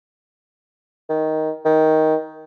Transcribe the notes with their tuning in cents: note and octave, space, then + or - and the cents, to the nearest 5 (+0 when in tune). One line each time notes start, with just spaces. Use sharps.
D#3 +10
D#3 +10